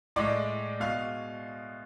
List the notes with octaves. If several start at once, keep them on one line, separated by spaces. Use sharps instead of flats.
A2 G#3 D5 D6
B2 G#3 F5 F6